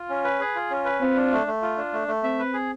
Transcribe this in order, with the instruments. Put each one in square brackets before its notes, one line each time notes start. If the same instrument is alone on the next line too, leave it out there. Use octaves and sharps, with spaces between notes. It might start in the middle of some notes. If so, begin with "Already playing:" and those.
Already playing: [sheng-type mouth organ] F4
C#4
B4
G#4
F4
C#4
B4
[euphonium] C4 [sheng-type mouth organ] F4
[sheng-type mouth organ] D4
A3
A3
F4
D4
A3
A3
[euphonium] C4 [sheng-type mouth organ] E5
[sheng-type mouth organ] B4
G#4